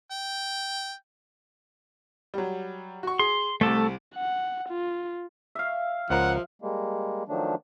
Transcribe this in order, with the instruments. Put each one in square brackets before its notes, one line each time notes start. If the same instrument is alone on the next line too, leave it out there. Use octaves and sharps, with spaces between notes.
[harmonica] G5
[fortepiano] F#3 G3
F#4 C#6
[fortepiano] G#4 [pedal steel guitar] C6
[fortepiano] C2 C3 [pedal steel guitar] A3 A4
[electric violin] F#5
F4
[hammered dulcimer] E5 F5
[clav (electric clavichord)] C#2 A#4 [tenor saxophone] F3 [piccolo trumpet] F#5
[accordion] G3 G#3 A#3
D#3 F3 F#3 A3 D4